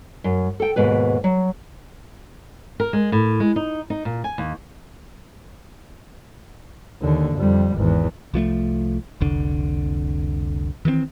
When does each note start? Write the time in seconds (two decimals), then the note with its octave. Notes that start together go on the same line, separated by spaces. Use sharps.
0.24 F#2
0.60 A4 G5
0.76 D#2 G#2 B2 B4
1.24 F#3
2.80 A#4
2.93 G#3
3.12 A2
3.40 G#3
3.56 D#4
3.90 D#4
4.05 A#2
4.24 G#5
4.38 D#2
7.02 D#2 D3
7.36 F2 G3
7.76 G#1 E2
8.34 C2 F3 G#3 A3
9.21 F1 C2 D3
10.85 D#3 E3 G#3 C4